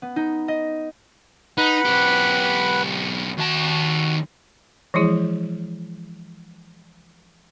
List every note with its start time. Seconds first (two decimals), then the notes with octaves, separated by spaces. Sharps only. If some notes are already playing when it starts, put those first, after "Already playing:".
0.02 B3
0.16 D#4
0.48 D#5
1.58 D#4 B4 F#5 B5
1.86 B1 G4
3.38 D#2 F#4 A5
4.94 E3 F3 G#3 E4 G#4